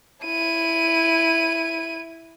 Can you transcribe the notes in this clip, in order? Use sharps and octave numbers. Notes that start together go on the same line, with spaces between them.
E4 D#7